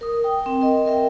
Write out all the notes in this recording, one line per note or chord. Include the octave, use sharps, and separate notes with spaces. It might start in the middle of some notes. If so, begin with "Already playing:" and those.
A#4 D#6
G5
C4 G5
A#4 D#5
A#4 E5 G5